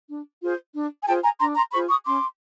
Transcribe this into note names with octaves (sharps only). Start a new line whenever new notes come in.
D4
F4 G#4 C5
D4
G#5
F4 G#4 C5 G5 A5
G#5 A#5
D4 A#5 C6
A#5 C6
F4 G#4 C5 B5 C#6
C#6 D#6
C#4 C6 D6